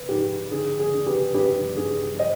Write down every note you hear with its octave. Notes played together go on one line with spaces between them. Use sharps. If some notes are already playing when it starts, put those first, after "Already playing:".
Already playing: B4
G#2 G4
D3 G#4
G#4
D4
G4 B4
G2 G4 B4
G2 G#4
C5 D#5